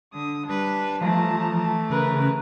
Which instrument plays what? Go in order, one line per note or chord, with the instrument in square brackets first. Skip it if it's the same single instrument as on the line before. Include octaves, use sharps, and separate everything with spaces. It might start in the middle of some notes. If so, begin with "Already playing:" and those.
[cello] D3 [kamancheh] D#6
[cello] G3 B4 [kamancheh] D4
[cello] E3 A3 [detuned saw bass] F3 [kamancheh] A5 A#5
[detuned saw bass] C#3 [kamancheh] A#4 B4